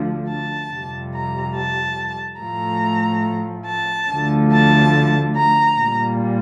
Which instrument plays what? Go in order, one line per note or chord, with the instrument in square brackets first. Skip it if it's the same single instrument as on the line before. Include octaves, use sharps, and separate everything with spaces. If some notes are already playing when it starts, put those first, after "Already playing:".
Already playing: [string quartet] D2 D3 F3
A5
F2 C3 G3
A#5
A5
A2 F3 A3 A#5
A5
D2 D3 F3 A3
A5
A#5
A#2 G3